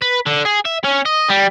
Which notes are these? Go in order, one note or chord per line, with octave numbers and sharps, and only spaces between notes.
B4
D3
G#4
E5
C#4
D#5
G3